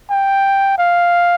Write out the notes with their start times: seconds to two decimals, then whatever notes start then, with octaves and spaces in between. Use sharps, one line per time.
0.11 G5
0.78 F5